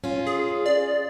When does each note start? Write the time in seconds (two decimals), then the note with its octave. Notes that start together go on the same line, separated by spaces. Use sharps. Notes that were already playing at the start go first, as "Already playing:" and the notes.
0.04 C#4 F4
0.27 G#4
0.66 D5